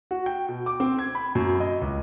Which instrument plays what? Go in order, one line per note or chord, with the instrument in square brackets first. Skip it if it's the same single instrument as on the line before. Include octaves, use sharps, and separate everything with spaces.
[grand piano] F#4
G5
B2
D6
C4
G#6
B5
F#2
D#5
C#2